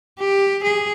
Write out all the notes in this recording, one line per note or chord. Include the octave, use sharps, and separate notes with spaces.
G4
G#4